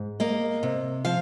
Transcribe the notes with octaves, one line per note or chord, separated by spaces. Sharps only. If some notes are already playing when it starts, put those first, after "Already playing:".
Already playing: G#2
A#3 D#5
C3
F3 F5